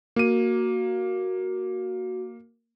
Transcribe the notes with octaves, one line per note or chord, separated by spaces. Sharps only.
A#3 F#4 D#7